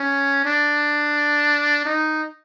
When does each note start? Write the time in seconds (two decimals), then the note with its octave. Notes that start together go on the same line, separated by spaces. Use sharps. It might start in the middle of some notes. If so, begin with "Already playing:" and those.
Already playing: C#4
0.45 D4
1.86 D#4